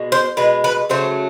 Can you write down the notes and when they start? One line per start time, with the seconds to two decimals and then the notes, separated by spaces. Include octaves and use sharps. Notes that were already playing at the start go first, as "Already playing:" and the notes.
Already playing: B2 G#3
0.12 C5
0.37 B2 G#3 B4
0.64 B4
0.89 C#3 F#3 A3 C5